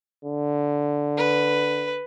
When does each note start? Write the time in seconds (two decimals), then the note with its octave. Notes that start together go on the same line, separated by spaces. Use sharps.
0.25 D3
1.17 B4